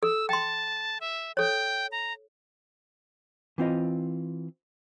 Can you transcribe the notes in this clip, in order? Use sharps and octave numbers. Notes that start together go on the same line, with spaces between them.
A4 E6
G5 A5 C6
E5
A4 C#5 G5
A#5
E3 C4 F4 D#5